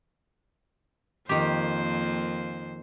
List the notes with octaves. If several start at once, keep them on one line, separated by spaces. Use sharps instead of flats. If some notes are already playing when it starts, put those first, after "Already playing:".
F2 D#3 A#3 G4 C5